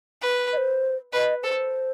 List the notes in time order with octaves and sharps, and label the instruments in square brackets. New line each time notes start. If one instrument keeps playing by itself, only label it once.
[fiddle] B4
[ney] D#5
C5
[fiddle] B4 [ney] D#5
[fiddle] A4 [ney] C5